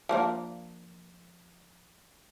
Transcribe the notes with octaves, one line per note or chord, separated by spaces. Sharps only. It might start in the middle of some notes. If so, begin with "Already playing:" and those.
F3 A#3 D4